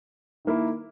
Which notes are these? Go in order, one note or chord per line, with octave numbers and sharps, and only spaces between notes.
D#3 A#3 E4